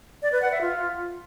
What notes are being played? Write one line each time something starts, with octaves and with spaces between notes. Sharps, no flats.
D5
B4
F#5
E5
F4